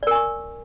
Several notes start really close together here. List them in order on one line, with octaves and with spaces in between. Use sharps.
D5 A#4 G#5 C#6